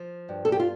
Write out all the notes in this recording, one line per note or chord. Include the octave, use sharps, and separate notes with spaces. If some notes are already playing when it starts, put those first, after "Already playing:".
Already playing: F3
G2
A4
G4
F4